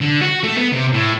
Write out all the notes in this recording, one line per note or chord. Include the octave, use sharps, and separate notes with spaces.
D3
F#4
A3
B3
C3
A2